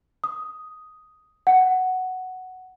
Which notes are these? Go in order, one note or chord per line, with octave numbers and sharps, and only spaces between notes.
D#6
F#5